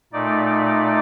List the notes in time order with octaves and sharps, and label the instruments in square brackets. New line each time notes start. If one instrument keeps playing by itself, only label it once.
[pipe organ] A#2 A3 D#4 D5